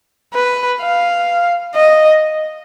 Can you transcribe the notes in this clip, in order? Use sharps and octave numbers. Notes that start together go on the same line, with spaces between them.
B4
F5
D#5